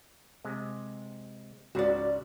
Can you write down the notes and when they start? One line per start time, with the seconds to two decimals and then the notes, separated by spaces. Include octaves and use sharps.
0.44 C3 G#3
1.75 C#2 G#2 C#3 F#4 D5